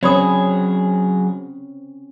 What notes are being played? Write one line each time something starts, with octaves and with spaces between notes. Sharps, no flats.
F#3 C4 C#4 G#4 C#5 D5 B5 D#6